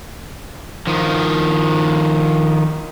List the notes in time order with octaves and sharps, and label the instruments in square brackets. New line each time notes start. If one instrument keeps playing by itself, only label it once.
[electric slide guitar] D#3 F3